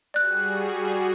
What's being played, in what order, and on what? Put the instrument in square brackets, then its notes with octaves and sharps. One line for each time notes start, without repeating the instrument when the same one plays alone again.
[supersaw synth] G3 F#4 G#4 [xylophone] D5 F#6